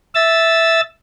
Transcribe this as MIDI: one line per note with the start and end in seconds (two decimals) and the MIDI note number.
0.15 0.81 76
0.15 0.81 88
0.15 0.81 93